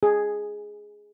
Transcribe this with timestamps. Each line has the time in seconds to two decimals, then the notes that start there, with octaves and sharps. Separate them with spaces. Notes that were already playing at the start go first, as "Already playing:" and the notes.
0.03 G#4